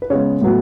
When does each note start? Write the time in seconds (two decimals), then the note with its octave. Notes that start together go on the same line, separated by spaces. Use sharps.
0.02 B4
0.10 C#3 G#3 B3 C#5
0.41 A2 F#3 B3